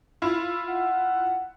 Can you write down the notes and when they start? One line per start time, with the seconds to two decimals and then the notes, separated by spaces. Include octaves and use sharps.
0.22 E4 F4
0.69 F#5